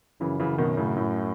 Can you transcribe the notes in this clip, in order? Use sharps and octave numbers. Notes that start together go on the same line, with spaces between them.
F#2 C#3 E3
C#3 E3
B2 D#3
A2 C#3
A2